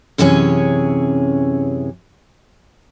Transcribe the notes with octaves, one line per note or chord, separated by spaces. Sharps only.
F#2 C3 E3 C#4 G#4 C#5